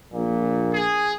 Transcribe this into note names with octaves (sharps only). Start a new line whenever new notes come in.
A#1 A#2
G#4